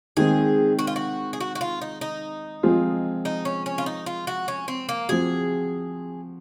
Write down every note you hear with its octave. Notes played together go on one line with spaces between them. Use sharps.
D#3 G#3 C4 G#4
F#4
F4
F#4
G#4
F#4
F#4
F4
D#4
D#4
F3 G#3 C4 F4 G#4
D#4
C#4
C#4
F4
D#4
F4
F#4
C#4
C4
A#3
F3 C4 F#4 G#4